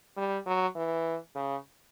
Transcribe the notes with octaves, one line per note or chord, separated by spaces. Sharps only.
G3
F#3
E3
C#3